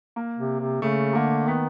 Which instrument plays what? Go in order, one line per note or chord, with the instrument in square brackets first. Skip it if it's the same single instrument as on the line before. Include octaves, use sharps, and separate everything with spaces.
[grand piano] A#3
[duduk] C3
C3
[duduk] C#3 [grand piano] A3
[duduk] D3 [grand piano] A#3
[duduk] D#3 [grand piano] B3